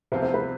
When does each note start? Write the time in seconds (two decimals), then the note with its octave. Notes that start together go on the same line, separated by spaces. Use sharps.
0.12 C2 C3 F3 B3 F4 C5
0.23 C5
0.34 B4